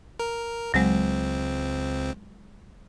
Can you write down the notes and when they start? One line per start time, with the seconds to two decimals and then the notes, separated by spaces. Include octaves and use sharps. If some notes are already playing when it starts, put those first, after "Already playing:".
0.19 A#4
0.74 C#2 F#3 G#3 C4